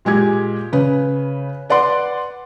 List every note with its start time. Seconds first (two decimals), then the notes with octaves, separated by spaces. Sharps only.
0.05 A#2 G#3 G4 G#6
0.73 C#3 B4
1.70 B4 D5 F#5 C6